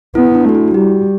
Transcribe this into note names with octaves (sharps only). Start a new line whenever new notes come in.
B3 E4
D4
A3 F#4
E4
F#4
G3 G4